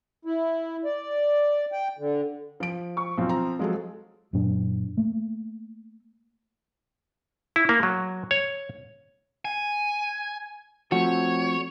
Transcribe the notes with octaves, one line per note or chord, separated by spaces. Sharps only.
E4
D5
G5
D3
F3 D7
C#6
B1 F3 C4
A#5
F3 F#3 G#3 A4
F#2 A#2 F#3 D4
A3 A#3
E4
A#3
F#3
C#5
G#5
F3 A3 C4 F#4 C#5